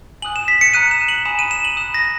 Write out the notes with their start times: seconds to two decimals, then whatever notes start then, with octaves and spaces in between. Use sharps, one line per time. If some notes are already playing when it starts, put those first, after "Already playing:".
0.22 G#5 D#6 F#6 F#7
0.36 E7
0.48 B6
0.61 C#7
0.73 A#5 D#6 F#6 D#7
0.91 E7
1.09 F#7
1.25 G#5 B5 D#6 F#6 E7
1.39 D#7
1.51 E7
1.65 F#7
1.77 B5 D#6 F#6 E7
1.94 A#6